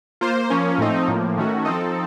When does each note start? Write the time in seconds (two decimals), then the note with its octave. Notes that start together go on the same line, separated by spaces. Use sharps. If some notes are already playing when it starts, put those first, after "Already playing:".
0.21 A#3 F4 C5
0.50 F3 A#3 C#4
0.78 A2 F3 A3 C4 D#4
1.08 A2 F3 A#3
1.37 D#3 A3 C#4 F#4
1.65 F3 C4 D#4 A4 D#5